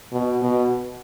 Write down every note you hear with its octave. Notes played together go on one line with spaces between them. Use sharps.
B2
B2